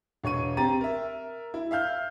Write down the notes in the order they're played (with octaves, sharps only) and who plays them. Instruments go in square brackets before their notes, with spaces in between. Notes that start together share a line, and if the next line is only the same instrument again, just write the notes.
[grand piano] E1 C#5 C#6 D#7
C4 G4 A#5 A6 D#7
A#4 E5
E4
E5 F5 F6 G6